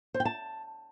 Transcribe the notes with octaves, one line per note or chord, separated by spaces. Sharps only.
C5
G5
A5